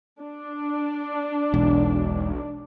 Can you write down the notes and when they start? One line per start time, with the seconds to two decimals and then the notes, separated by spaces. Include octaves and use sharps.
0.21 D4
1.54 E1 B1